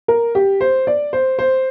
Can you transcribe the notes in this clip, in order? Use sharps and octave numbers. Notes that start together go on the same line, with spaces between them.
A#4
G4
C5
D5
C5
C5